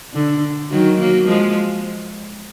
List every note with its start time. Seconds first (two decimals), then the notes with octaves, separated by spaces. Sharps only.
0.13 D3
0.71 D#3 F#3
0.99 F#3 A#3
1.27 F3 G#3